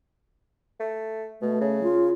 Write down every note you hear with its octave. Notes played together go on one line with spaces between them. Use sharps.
A3
B2 A3
C#3
F4